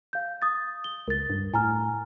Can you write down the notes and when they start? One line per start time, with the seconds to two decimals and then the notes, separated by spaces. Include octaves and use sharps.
0.13 F5 G6
0.42 D#6 A6
0.84 G7
1.08 C#2 A#4 A6
1.30 G2
1.54 A2 G#5 A#5 F6